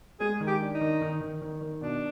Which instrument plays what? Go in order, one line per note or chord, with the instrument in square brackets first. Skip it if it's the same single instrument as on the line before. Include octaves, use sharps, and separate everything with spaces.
[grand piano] G#3 [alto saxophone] G#4
[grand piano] D#3
[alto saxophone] G4
[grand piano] D4
[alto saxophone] D#4
[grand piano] D#3
D#3
D#3
D#3
D#3
[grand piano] B2 [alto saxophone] D4